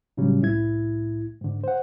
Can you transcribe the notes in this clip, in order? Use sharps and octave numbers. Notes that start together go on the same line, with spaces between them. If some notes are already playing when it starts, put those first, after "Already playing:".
A2 C#3 F#3 G3 C#4
C2 A2 E4 G#6
G#2 D3
C5 F#5